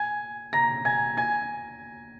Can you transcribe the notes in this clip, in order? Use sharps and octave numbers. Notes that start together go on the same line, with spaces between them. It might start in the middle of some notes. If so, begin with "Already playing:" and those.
Already playing: G#5 G#6
A#5 A#6
G#5 G#6
G#5 G#6